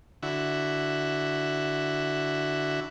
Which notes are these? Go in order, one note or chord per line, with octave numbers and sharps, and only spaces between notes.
D3 E4 F#4